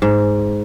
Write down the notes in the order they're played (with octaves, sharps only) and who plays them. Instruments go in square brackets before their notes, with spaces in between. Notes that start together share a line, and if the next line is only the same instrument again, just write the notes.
[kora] G#2